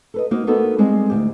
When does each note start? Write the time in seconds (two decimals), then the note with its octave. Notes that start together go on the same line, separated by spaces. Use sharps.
0.14 A4 B4 D#5
0.31 A#3 D#4 F#4 C5 D#5
0.47 A#3 B3 D#4 F#4 A4 A#4
0.78 G3 G#3 C4
1.10 D2 B2 G4